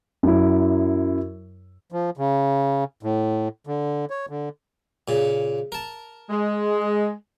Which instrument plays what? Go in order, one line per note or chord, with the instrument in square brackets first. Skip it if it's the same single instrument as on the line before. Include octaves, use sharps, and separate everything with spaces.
[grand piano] F#2 E4
[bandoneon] F3
C#3
A2
D3
C#5
D3
[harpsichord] A#2 C#3
A#4 A5
[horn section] G#3